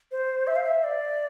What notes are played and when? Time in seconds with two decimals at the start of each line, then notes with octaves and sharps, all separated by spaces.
0.11 C5
0.47 E5
0.56 F5
0.64 E5
0.84 D5